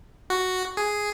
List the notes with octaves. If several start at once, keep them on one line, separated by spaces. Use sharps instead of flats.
F#4
G#4